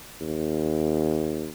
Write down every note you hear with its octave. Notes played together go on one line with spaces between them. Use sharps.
D#2